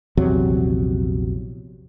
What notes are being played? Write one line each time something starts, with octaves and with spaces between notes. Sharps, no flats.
A#1 E2 C3 F#3